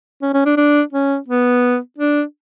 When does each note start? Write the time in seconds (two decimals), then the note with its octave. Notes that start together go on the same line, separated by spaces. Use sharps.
0.22 C#4
0.34 C#4
0.45 D4
0.57 D4
0.93 C#4
1.28 B3
1.98 D4